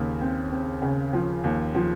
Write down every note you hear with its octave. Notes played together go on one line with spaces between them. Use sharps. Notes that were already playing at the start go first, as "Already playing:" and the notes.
Already playing: D#2 C#3
C4
C4
C#3
F3
D#2
F3